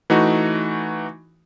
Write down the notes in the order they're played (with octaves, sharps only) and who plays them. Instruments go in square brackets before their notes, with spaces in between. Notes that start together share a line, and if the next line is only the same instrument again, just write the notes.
[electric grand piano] E3 A3 D#4 F#4